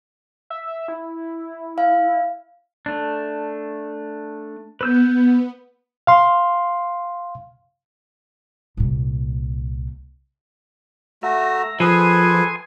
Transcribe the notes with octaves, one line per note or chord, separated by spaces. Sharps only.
E5
E4
F5
A3 D4
B3 B4 E6 G6
F5 C6
C2 A#2
A3 F#4 E5 A#5
F3 G#4 A4 B4 G#5 C6 D#6